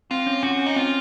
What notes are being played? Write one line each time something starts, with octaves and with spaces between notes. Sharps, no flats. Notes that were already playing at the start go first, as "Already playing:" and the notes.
C4 F4
C#4
C#4 F#4
C#4
D#4
C4 F4